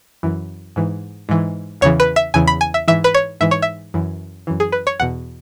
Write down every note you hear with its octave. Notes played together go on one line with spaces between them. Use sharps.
F#2 E3
G#2 E3
G#2 E3
E2 C#3 E3 C#5
B4
E5
E2 C#3 E3 G#5
B5
G#5
E5
G#2 E3 E5
B4
C#5
G#2 E3 E5
C#5
E5
F#2 E3
F#2 E3
G#4
B4
C#5
E2 B2 F#5